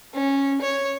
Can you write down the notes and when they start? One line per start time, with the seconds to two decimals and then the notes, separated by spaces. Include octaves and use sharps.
0.14 C#4
0.61 C#5